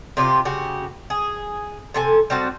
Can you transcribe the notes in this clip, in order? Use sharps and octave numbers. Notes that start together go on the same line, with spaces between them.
C3 D4 F4 G4
C#3 F#4 G4
G#4
C3 A4 G#5
G3 C4 F#4 A5